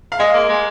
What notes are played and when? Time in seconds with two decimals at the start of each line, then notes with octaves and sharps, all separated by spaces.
0.12 F5
0.19 G#3 D#5
0.34 A#3
0.49 G#3